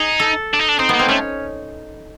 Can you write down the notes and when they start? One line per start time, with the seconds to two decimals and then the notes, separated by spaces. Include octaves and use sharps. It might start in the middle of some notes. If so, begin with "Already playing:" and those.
Already playing: D#4 G#4
0.20 A4
0.54 D4
0.59 D#4
0.69 D4
0.79 C4 D#4
0.89 A#3 B3
0.99 C4
1.09 A3 C#4